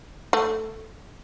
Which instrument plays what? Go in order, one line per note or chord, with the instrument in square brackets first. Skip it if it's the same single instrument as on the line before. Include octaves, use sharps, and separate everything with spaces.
[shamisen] A3